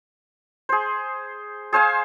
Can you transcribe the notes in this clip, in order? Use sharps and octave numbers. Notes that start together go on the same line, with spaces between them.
G#4 C5
G#4 C5 F5 G#5